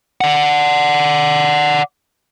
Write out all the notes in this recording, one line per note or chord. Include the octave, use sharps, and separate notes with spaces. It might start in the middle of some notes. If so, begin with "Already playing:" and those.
D5 F#5